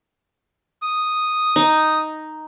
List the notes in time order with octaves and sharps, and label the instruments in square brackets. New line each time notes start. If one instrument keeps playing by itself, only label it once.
[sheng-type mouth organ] D#6
[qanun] D#4